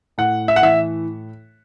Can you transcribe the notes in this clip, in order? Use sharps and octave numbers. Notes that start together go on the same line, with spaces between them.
A2 F#5
E5
F#5
E3 E5